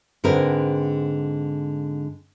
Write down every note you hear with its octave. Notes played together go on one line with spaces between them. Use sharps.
G#2 D3 C4 G#4 A#4 B4